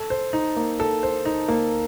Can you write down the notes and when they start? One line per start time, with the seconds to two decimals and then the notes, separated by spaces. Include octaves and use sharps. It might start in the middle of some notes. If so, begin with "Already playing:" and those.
Already playing: A4
0.10 C5
0.33 D#4
0.56 A#3
0.80 A4
1.03 C5
1.25 D#4
1.49 A#3